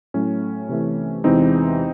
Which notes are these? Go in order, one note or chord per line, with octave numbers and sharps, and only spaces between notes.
A2 F#3 A3 C#4
C3 E3 A3
E2 C3 E3 G#3 C4 D#4